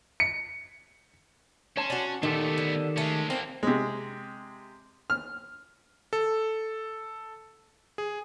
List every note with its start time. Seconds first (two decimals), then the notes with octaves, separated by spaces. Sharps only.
0.20 C#7
1.77 C#4 C#5 A5 C6
1.90 D4 F#4
2.23 A#2 D#3 A3 B3 G4 A4
2.58 D3
2.97 G#3 A3 C#4
3.30 A#3 C4 D4
3.63 C3 G#3
5.10 F6
6.13 A4
7.98 G#4